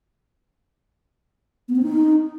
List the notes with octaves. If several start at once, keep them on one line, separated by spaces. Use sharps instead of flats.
B3
C4
D#4